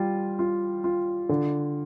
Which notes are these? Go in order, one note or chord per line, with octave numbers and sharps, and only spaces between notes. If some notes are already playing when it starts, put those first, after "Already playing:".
Already playing: G3 F4
F4
F4
D3